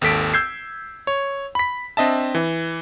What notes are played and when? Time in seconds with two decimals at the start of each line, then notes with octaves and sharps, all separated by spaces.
0.01 G#1 D#2 A4 B6 D7
0.34 E6 G6 G#6 C7
1.07 C#5
1.55 B5 B6
1.97 C4 D4 D#5 E5 A5
2.35 E3